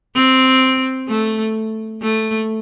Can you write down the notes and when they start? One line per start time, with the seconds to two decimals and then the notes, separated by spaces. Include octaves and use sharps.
0.15 C4
1.08 A3
2.02 A3